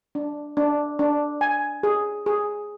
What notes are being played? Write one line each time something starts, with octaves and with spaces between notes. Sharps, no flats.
D4
D4
D4
G#5
G#4
G#4